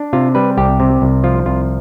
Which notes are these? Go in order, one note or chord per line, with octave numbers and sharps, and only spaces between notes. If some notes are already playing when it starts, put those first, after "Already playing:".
Already playing: D4
C3 F4
G3 B4
C2 G4
C3
C2
F3 F4
C2 F4